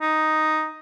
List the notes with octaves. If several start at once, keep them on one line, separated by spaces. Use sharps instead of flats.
D#4